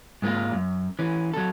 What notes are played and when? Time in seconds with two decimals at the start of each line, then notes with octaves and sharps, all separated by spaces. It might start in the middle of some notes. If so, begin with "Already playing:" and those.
0.22 G#2 G#3 A#3 F4
0.54 F#2
0.99 E3 C#4
1.34 F#3 A4